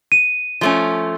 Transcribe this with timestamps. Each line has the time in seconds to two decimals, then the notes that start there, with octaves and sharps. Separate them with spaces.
0.12 D#7
0.61 F3 A3 C#4